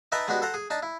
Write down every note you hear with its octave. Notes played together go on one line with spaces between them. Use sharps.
D#4 B4 E5 G5 A5 A#5
G#3 B3 D4 F#4 G4
A4 C5 F#5 A#5
G#4
D4 D#4 A5
E4